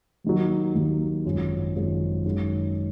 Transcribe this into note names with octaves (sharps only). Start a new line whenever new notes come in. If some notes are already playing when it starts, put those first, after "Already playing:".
D#2 D#3 F#3
D#2 D#3 F#3
G#1 F#2 F3 G#3
G#1 F#2 F3 G#3
F#2 D#3 G#3